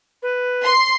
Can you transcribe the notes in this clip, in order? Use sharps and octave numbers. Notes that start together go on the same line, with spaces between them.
B4
C6